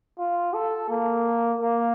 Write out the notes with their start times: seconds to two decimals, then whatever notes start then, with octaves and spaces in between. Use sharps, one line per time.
0.19 F4
0.54 A4
0.90 A#3
1.61 A#3